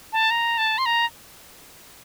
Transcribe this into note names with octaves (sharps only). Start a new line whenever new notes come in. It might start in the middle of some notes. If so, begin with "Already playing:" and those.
A5
A#5
A5
C6
A#5